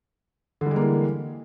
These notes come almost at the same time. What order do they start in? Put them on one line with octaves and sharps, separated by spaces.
D3 G3 G#3 A#3 E3